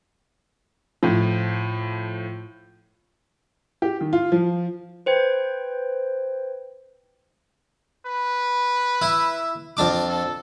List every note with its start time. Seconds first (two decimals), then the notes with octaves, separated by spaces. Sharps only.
1.03 A2 F3
3.82 G4
4.01 D#3
4.13 F4
4.32 F3
5.06 B4 C5 G5 G#6
8.06 B4
9.02 E4
9.77 F2 D4 D6
10.10 A4